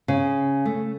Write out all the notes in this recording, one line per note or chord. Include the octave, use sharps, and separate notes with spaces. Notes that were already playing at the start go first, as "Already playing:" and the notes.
C#3
A3